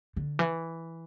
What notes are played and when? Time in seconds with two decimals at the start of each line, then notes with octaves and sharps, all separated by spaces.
0.16 D3
0.39 E3